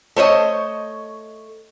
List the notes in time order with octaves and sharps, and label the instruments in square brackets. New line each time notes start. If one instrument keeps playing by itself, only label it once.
[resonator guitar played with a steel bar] A3 C5 C#5 D#5